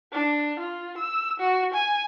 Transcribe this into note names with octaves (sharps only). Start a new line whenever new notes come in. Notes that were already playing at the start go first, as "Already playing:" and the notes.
D4
F4
E6
F#4
G#5